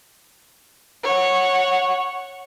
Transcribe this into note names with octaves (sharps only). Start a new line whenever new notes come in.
C#5 F#5